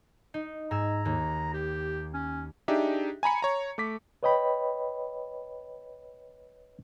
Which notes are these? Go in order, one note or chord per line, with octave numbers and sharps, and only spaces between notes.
D#4
G#2 G#5 A#5 E6
D#2 A#3
G4
C#4
D4 D#4 G4 G#4 E5
G#5 A#5 B5 C#7
C#5 A#5
A3 D6 B6
B4 C#5 D#5 G5 B5